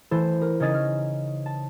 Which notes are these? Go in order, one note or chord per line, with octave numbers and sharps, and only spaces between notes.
E3 A3 E4 A4 C5
A#4
C#3 C#4 D#4 D#5 G#6 A6
F6
A5